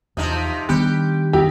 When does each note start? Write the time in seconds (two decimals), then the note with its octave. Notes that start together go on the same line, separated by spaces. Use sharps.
0.17 E2 C3 F3 D#4 D#6
0.69 D#3 G3 B3 D4 G4
1.33 D#4 E4 G4